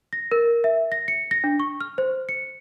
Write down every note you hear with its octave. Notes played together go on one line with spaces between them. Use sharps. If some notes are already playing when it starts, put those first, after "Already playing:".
A#6
A#4
E5
A#6
C#7
A#6
D4
C#6
F6
C5
C#7